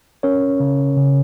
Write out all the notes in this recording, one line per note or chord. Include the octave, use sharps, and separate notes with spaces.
C#4 A#4 C#5
C#3
C#3